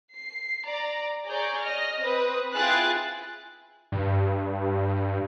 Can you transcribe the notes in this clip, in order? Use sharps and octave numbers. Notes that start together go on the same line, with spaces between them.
C7
D5 A#5
G#4 C#5 D5 A#5 G6
D#5 F6 A#6
C4 B4 D#6
E4 F4 G#4 G5 F#6 A6
G2